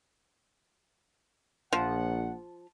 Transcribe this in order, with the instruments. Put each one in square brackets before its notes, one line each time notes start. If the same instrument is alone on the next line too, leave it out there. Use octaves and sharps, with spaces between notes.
[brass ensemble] A#1 F#5 [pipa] F3